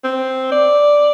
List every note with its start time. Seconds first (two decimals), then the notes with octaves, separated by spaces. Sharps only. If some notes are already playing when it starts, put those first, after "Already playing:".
0.04 C4
0.52 D5